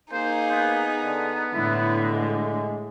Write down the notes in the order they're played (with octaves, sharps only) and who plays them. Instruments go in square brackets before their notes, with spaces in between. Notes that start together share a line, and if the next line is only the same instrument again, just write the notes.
[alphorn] A#3 [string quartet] D#4 G#4 [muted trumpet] C5
[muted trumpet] B3
[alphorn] D3
[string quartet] A2 D3 [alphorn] E4
[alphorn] G#3